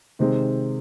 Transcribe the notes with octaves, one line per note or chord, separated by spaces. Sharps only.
C3 D#3 G#3 C4